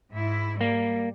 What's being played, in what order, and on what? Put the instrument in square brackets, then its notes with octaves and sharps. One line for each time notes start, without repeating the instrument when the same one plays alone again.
[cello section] G#2 E4
[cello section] G3 [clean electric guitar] A#3